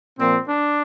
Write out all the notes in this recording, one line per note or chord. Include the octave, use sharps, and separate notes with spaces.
A#2 F3 A#3 C4
D4